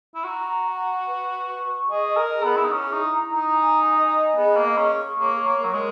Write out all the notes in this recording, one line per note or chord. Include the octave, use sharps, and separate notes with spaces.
E4
F#4 A#5
F#5
B4
C#6
G#4 D#5
A#4
G#4
B3
E4
D#4
C#4 E4
D#4
A#5
D#4
G#5
D#5
B3 G#4
A#3
C#4 C#6
A#3 C#5
A#3
F#3 A#4
G#3